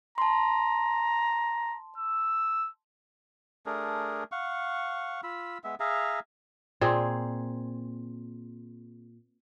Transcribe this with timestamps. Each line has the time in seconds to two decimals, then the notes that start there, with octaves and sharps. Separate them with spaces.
0.18 A5 A#5 C6
1.98 E6
3.66 A3 D4 G#4 A#4
4.32 F5 F#5 C#6
5.23 F4 B5 E6
5.64 G#3 B3 E5
5.80 G#4 E5 F5 A#5
6.81 A#2 C4 G#4